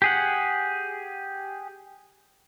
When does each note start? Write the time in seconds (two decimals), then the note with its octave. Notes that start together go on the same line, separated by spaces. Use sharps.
0.02 G4 G#4 F#5